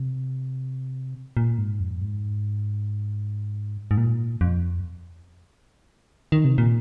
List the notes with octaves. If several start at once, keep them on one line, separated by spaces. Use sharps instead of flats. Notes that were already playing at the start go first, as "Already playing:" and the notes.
Already playing: C3
A#2
G#2
F2
G#2
G#2
A#2
F2
D#3
C3
A#2